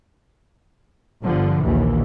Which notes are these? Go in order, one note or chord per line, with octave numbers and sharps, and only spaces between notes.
G1 D3 F3
A#1 D#2 E3